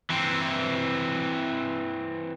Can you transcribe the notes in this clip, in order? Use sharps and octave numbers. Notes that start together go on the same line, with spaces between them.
E3 C4